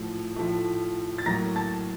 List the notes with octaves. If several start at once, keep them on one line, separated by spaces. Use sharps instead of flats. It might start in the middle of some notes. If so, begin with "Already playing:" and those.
Already playing: A2 F3 A3
A2 F3 A3
A6
A2 F#3 A#3 A#5 A#6
A5 A6